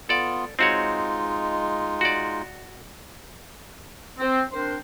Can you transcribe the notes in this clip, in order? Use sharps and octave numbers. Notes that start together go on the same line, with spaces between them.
B3 F4 A4 D5
G#3 C4 D#4 F4 F#4 C#5
F#4 D5
C4
C4 D4 A#4 C5